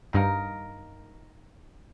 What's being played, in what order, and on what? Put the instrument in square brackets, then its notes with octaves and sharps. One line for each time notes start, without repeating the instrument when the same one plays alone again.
[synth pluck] G2 [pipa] D#3 A#3 D#4 A#4